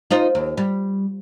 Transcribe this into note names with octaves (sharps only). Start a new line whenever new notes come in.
D#4 F4 C5
D#2
G3